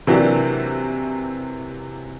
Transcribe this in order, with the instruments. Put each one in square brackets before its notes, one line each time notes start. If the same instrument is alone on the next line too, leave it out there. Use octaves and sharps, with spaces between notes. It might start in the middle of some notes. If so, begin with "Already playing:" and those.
[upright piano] C3 E3 F#3 A#3 D4 G4